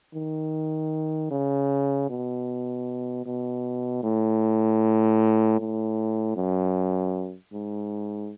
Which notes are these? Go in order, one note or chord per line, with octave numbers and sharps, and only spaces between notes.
D#3
C#3
B2
B2
A2
A2
F#2
G#2